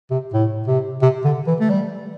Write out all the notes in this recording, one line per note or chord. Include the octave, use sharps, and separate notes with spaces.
C3
A2
C3
C3
D3
E3
A3
G3